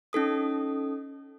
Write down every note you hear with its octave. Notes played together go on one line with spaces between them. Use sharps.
C#4 D#4 A4 D#6